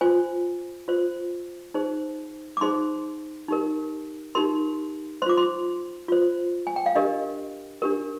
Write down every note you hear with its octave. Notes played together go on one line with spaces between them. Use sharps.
F4 C5 G#5
F4 C5
D#4 G#4 C5
D6
D#4 G#4 C5 C6
D#4 G4 A#4
D#4 G4 A#4 C6
F4 C5 C6 D6
C6
F4 C5
G#5
G5
F5
D4 G4 A#4 D#5
D4 G4 A#4